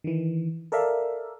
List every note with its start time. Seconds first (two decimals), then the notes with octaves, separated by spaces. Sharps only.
0.04 D#3 E3
0.72 A4 A#4 D5 E5 F5